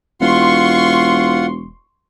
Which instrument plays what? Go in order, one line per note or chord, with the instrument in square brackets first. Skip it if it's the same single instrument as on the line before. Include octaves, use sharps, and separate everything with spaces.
[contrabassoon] E1 [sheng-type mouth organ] F4 F#5 [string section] C6 C#6